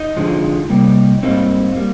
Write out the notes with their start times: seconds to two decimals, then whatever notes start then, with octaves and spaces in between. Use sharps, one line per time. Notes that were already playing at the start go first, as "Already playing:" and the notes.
Already playing: D#4
0.16 F2 D3 F3 G#3
0.69 C3 G3 A#3
1.23 G#2 G3 A#3 C4 D#4
1.76 G3 A#3